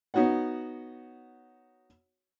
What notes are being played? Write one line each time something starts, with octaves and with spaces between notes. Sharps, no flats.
B3 D#4 F#4 C#5 F#5